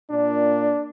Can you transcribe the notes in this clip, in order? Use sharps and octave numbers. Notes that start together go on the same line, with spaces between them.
A#2 D4 D5